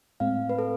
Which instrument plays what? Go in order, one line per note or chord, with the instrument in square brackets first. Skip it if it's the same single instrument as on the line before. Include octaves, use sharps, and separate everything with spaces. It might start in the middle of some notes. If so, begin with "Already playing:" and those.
[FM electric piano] A2 G#3 C4 [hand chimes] F5
[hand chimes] B4
A4